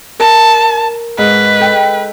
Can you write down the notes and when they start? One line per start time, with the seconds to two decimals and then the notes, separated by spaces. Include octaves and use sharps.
0.20 A#4 A5
1.18 G#2 B4
1.60 A4 G5